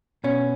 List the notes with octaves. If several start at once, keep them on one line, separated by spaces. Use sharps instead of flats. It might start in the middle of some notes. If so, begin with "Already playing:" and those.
B2 C#4